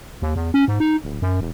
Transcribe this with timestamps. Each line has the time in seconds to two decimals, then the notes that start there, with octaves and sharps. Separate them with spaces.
0.22 D#2
0.36 E2
0.54 C#4
0.68 G#2
0.80 D#4
1.04 D1
1.22 F#2
1.41 E1